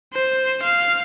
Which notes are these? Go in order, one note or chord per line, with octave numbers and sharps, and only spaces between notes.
C5
F5